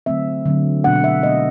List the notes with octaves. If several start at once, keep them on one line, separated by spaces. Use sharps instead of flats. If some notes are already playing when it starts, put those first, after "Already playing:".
D3 F#3 A3 C4 E5
D3 F#3 A3 C4
B2 G#3 B3 D4 F#5
E5
B2 G#3 B3 D4 D#5